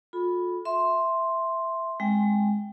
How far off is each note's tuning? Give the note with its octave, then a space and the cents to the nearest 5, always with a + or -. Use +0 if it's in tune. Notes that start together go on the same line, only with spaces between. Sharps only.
F4 +35 A4 -15 B5 +0
E5 +0 C6 +0
G#3 +0 C4 +15 G5 +0